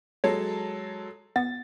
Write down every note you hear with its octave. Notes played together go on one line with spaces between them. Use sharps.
F#3 G#3 A4 C#5
B3 A6